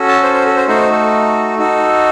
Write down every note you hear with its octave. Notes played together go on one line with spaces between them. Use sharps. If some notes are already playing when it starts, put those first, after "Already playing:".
Already playing: C#4 F#4 A4
A5
C5
C5
A4
C5
A3 D#4 F#4 A4 C5
A4
D#4 F#4 A4